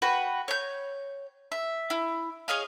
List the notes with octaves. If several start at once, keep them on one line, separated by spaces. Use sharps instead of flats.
F#4 B4 G5
C#5 G6
E5
E4
G#4 C#5 D#5 F5